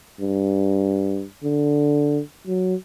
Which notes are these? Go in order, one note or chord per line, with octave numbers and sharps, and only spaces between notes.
G2
D3
F#3